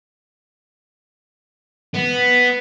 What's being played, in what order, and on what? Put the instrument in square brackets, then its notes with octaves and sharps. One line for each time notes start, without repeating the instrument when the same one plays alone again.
[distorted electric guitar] B3